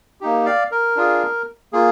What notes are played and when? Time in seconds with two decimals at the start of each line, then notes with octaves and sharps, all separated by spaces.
0.21 A#3 D#4 G4
0.46 D5 F5
0.71 A#4
0.96 D4 F4 G#4
1.73 A#3 F4 G#4